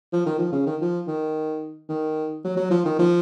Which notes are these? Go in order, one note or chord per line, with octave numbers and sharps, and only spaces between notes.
F3
D#3
F3
C#3
D#3
F3
D#3
D#3
F#3
F#3
F3
D#3
F3